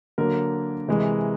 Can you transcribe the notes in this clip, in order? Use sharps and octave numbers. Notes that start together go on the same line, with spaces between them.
D3 F#3 A#3 A#4
C3 E3 G#3